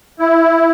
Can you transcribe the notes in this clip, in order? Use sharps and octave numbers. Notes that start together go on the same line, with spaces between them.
E4